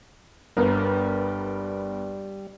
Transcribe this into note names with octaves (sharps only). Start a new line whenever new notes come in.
G1 G3 B3 A#4